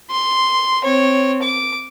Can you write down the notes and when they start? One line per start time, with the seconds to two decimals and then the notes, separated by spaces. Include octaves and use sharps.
0.11 C6
0.84 C4 C#5
1.43 D6